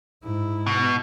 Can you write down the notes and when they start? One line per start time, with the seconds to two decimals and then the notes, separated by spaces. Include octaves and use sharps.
0.23 G#2 E4
0.66 B2